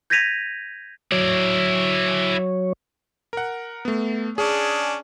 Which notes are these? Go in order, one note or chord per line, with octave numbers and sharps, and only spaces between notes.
G6 G#6 A#6 B6 D#7 F7
F#3 E4 C#5 D5
A#4 F#5
A3 B3
C#4 D4 G#4